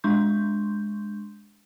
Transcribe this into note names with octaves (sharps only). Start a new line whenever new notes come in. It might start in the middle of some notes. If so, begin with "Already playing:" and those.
G#3 D4 C6 C#6 G6